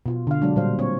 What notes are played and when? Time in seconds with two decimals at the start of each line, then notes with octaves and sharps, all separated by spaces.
0.06 B2 F4
0.27 D3 F5
0.42 F#3 G#3 D4
0.56 A#2 G3 C5 F5
0.79 C4 C#5